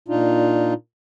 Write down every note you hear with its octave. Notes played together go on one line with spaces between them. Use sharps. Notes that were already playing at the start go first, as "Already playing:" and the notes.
A#2 D4 D#4 F4